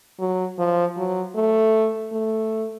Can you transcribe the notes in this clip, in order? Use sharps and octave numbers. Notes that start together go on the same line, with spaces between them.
F#3
F3
F#3
A3
A3